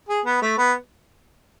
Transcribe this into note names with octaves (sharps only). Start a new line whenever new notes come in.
G#4
B3
A3
B3